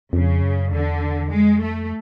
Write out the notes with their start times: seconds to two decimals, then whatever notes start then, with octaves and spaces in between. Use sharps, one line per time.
0.13 F2 C#3
0.42 F#2
0.72 E2 D3
1.31 F2 G#3
1.61 A3